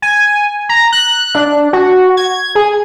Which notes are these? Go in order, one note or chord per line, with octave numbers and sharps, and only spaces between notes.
G#5
A#5
F#6
D4
F#4
G#6
G#4